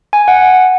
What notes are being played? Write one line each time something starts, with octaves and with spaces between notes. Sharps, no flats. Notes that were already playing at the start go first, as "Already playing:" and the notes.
G#5
F#5